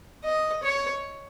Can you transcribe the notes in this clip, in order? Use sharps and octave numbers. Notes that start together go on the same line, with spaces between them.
D#5
C#5